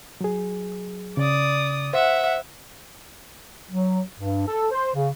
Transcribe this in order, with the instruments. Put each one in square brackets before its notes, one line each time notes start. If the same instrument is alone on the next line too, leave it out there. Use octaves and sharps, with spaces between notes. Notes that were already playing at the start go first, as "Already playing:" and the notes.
[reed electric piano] F#3 G#4
[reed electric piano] C#3 [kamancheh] D5 D#6
[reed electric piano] C5 [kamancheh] E5 F#5
[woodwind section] F#3
G2
A4
C5
C#3